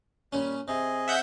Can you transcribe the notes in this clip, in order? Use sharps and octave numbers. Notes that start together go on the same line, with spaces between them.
A#2 G3 C#4
C3 G#4 D#5
E5 F#5 G6